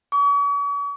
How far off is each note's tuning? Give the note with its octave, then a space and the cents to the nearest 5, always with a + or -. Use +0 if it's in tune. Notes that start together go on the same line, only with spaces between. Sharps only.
C#6 +45